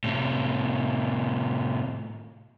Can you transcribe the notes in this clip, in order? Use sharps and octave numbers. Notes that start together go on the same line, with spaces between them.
A2 C3